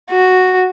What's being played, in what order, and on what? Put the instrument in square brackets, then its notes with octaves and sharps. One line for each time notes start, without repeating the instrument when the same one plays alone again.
[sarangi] F#4